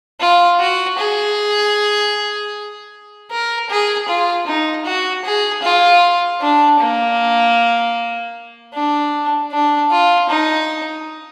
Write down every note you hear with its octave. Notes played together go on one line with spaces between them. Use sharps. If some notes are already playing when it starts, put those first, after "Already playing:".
F4
F#4
G#4
A#4
G#4
F4
D#4
F#4
G#4
F4
D4
A#3
D4
D4
F4
D#4